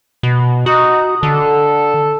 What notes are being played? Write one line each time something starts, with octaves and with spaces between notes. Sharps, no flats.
B2
D#4 F#4
D3 A4